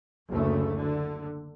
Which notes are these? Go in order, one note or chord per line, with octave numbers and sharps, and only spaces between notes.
F#1 D2 C#3 A3
D3